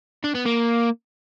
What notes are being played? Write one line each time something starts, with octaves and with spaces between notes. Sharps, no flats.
D4
B3
A#3